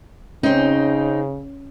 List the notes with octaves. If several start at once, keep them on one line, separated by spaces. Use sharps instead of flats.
C#3 C4 C#4 D#4